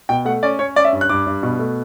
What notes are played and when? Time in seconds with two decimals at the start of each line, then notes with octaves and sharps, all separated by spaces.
0.09 B2 G5
0.25 A3 F#5
0.43 C#4 D5
0.59 C#4 C#5
0.76 C#4 D5
0.85 E5
0.93 G2
1.01 F#6
1.09 G2 D6
1.27 G2
1.43 B2
1.59 A3